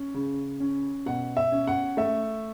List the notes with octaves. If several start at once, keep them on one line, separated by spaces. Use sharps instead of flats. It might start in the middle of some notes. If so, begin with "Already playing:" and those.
Already playing: C#4
C#3
C#4
B2 F#5
E5
C#4
F#5
A3 E5